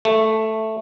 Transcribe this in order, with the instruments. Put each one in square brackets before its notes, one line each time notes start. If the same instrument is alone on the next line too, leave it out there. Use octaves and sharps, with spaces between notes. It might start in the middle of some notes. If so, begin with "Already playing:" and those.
[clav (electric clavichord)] A3